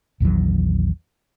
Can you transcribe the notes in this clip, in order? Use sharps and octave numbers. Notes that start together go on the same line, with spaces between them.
A#1 E2 D#3 F#3